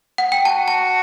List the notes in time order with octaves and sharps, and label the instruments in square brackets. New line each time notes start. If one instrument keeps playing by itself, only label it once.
[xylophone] F#5
G5
[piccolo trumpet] F#4 [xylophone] A5
[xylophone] A5